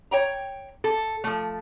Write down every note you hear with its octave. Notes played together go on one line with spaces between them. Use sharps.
C#5 G5 A#5
A4
F3 A3